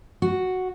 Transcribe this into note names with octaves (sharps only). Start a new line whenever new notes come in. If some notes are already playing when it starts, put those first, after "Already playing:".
F#4